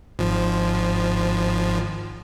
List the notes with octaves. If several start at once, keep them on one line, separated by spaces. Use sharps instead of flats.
G#1 F3